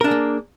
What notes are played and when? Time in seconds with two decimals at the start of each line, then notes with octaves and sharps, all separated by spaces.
0.01 A#4
0.04 D4
0.08 G#4
0.11 A#3